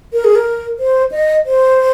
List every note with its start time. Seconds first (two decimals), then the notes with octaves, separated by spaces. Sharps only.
0.13 A#4
0.24 G#4
0.36 A#4
0.79 C5
1.12 D#5
1.46 C5